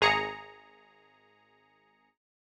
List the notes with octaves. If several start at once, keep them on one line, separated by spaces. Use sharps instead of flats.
G#1 G#4 A#5 C#7